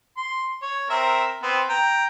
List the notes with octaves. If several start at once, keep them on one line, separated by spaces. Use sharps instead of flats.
C6
C#5
C4 A#4 E5
B3 C4
G5 A#5